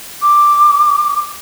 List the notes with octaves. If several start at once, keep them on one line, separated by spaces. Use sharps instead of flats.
D6